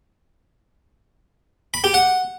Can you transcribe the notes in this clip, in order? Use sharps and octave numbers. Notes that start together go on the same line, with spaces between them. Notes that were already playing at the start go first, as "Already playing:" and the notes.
B5
G4
F#5